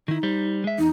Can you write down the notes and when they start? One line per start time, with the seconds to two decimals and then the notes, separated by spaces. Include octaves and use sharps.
0.08 D#3 D#4 E4
0.23 G3 C5
0.64 G#3 E5
0.78 E2 D#4